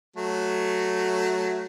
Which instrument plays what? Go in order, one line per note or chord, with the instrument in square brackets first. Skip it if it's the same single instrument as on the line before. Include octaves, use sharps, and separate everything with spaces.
[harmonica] F#3 A3